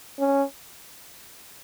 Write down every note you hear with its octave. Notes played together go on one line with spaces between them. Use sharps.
C#4